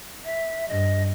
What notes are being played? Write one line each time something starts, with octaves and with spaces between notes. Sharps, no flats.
E5
G2 D#5